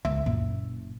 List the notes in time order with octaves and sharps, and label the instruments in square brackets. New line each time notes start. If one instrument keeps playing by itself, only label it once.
[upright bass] C#2 [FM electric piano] E5
[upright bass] F#1 [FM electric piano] A#2